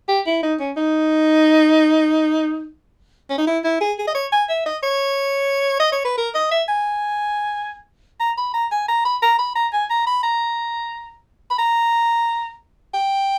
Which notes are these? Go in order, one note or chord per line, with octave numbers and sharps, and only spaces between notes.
G4
E4
D#4
C#4
D#4
C#4
D#4
E4
E4
G#4
G#4
D#5
C#5
G#5
E5
D#5
C#5
D#5
C#5
B4
A#4
D#5
E5
G#5
A#5
B5
A#5
G#5
A#5
B5
A#5
B5
A#5
G#5
A#5
B5
A#5
B5
A#5
G5